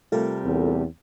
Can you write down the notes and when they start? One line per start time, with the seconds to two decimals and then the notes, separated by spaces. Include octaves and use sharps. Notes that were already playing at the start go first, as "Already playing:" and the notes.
0.12 C3 G3 A3 F4 A4 A#4
0.45 E2 C4